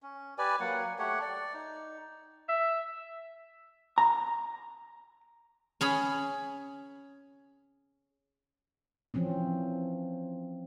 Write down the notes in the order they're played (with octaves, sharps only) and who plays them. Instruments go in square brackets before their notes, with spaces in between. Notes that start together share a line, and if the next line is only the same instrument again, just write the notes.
[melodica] C#4
G4 B4 D5 G#5
F#3 A#3 F#5
A3 G4 C#5 F#5
D5
D#4
[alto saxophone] E5
[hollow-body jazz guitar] A#5
[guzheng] C#4 G#4 B5
[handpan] E3 F3 C4 C#4